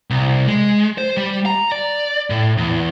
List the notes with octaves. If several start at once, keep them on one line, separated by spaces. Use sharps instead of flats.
C2
G#3
C5
G3
A#5
D5
A2
E2